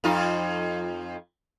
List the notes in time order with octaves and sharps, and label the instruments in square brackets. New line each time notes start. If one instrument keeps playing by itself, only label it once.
[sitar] F2 D#4 F4